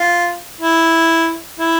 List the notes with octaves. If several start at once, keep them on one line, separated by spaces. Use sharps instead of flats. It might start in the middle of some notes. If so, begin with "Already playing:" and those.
Already playing: F4
E4
E4